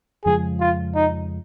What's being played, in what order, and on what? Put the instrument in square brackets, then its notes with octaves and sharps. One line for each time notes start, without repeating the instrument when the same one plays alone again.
[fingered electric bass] F2 C#3 F3 G#3 [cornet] G#4
[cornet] F4
D#4